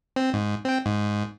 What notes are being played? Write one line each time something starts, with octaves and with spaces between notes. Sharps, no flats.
C4
G#2
C4 G5
G#2